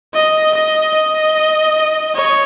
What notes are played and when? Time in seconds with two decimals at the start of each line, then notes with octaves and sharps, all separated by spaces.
0.14 D#5
0.54 D#5
0.94 D#5
2.15 C#5